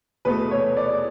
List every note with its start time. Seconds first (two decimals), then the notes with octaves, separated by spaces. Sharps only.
0.25 E2 B2 A3 B4
0.51 C#5
0.77 D5